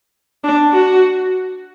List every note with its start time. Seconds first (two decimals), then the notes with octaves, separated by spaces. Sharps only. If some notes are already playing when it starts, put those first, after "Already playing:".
0.44 D4
0.72 F#4